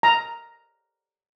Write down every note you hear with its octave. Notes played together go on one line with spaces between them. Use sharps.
A#5